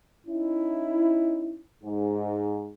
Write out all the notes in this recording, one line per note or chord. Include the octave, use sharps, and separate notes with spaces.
C#4 D#4 E4
G#2